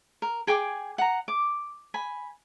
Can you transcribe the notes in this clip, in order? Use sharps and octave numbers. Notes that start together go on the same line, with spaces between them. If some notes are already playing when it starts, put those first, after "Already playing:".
A#4
G#4 G5 G#5 D6
F#5 A#5
D6
G#5 B5